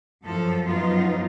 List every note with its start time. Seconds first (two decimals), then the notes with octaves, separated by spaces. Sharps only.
0.24 F#2 F3 A4
0.66 F#2 F3 F#3 B3 D#4 F4